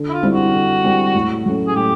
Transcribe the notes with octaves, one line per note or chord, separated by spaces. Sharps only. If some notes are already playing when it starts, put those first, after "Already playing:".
Already playing: D3
E4
F4
G3 C4 E4
F#4
D3
G3 C4 E4
A2
F#3 A3 C#4
G#4
A2 G4